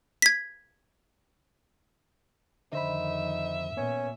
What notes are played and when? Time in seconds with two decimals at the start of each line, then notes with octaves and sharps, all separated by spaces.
0.22 G#6 B6
2.73 F2 D3 D#3 D#4 C5 E5 B5
3.77 A#2 B3 C#4